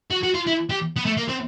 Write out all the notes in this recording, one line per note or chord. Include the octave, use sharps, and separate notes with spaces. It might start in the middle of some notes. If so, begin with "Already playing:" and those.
F#4
F#4
F4
E4
G4
B3
A3
A#3
C4